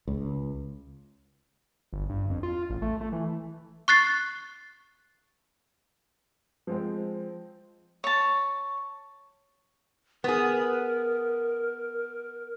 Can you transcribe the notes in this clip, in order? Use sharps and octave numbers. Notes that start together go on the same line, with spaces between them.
C#2
G1
G2
F2
F4
A1
A3
A3
E3
C#6 F#6 A6 C7
F3 G#3 C4
C#5 A5
B3 G#4 A#4